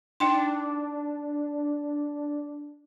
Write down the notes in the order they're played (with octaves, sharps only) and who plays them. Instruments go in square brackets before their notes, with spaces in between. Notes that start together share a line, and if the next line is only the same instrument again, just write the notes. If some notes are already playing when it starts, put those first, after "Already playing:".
[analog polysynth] D4 [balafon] D#4 G5 C6